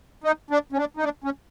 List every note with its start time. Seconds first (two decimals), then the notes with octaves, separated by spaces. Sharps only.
0.24 D#4
0.51 D4
0.73 C#4
0.77 D4
0.97 D#4
1.03 D4
1.24 C#4